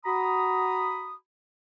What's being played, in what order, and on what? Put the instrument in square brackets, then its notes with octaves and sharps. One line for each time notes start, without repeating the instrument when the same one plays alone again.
[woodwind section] F#4 A#5 B5 D#6